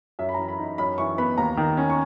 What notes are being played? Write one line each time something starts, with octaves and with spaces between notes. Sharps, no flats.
F#2 E5
B5
A#5
E3
B5
D#4
B5
F#2 B5
E3 C#6
B3 B5
D#2 A#5
D#3
C#4
C#6